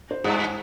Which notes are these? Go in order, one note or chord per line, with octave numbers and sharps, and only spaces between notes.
C5
G2 G#4